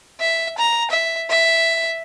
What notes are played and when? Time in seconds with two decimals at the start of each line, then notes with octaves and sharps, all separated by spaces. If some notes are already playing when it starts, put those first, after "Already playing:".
0.20 E5
0.58 A#5
0.90 E5
1.30 E5